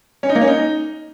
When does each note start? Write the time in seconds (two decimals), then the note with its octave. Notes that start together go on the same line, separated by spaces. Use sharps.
0.23 C#4
0.29 D#4
0.35 A#3
0.41 C#4
0.47 D#4